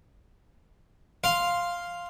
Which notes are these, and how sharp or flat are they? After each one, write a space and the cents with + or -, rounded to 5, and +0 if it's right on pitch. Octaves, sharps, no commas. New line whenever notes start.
F5 +0 C6 +0